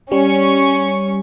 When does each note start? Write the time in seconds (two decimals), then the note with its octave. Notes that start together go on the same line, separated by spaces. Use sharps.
0.12 G3 C#4 C#6